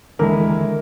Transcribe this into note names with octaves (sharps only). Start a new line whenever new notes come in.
D#2 D3 E3 G#3 E4 A#4